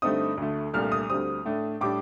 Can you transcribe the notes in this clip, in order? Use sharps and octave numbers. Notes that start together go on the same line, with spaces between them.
G2 D3 A3 C4 D#4 D#6
D2 D3 A3
C2 A#2 A3 D4 F6
D#6
D2 D3 G3 C4 D#6
A2 A3 D4
A2 G3 D4 D6